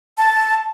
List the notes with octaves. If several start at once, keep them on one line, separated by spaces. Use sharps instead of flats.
A5